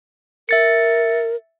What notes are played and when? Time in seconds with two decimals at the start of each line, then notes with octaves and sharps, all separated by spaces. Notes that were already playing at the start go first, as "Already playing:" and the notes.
0.49 A#4 E5 A6 C#7